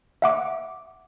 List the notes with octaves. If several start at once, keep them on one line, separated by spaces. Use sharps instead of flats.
E5 F#5 D6